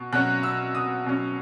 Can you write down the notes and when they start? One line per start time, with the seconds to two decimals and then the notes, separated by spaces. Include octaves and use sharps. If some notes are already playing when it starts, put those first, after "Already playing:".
Already playing: B2
0.13 B2 F#3 C#4 F#6
0.43 E6
0.75 D#6
1.06 B2 F#3 C#4